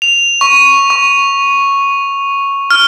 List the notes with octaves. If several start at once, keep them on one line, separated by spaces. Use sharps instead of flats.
F7
C#6
C#6
F6